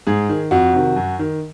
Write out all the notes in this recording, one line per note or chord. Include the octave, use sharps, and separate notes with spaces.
G#2 G#4
D#3
F2 F#4
C3 D#3
F#2
D#3